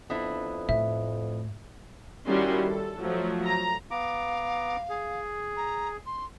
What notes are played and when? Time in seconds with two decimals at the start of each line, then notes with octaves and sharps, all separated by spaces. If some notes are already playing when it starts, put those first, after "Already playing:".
0.10 F2 B3 D4 E4
0.69 A2 E5
2.26 D#3 G3 C#4 E4 F#4 C6
2.67 A4
2.99 F3 F#3 A3
3.46 A#5
3.91 B3 F5 A#5 D6
4.89 G#4
5.57 A#5
6.06 C6